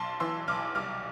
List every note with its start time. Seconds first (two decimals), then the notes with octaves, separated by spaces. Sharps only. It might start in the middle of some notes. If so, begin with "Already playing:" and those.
Already playing: B1 A5 C6
0.20 E3 C6 E6
0.48 B1 D6 F6
0.75 C2 D6 F6